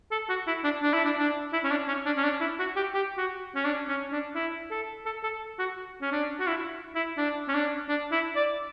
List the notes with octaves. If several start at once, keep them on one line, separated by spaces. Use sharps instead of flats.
A4
F#4
E4
D4
D4
E4
D4
D4
E4
C#4
D4
C#4
D4
C#4
D4
E4
F#4
G4
G4
F#4
C#4
D4
C#4
D4
E4
A4
A4
A4
F#4
C#4
D4
F#4
E4
E4
D4
C#4
D4
D4
E4
D5